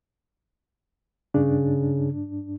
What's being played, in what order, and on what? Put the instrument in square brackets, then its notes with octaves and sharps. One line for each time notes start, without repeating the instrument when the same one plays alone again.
[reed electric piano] G2 D4 [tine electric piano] C#3